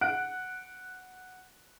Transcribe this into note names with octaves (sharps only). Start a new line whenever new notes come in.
F#5 F#6 D7